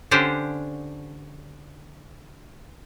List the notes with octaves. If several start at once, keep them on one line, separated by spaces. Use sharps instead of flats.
D3 C#4 D4 G4 C5 F#5